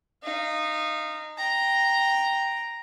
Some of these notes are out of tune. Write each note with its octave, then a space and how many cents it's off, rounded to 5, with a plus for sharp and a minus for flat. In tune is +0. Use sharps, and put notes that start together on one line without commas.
D#4 -15 F5 -25
G5 +0 A#5 +0